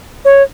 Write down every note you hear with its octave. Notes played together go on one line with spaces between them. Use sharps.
C#5